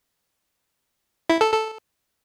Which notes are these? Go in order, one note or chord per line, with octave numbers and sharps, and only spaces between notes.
E4
A4
A4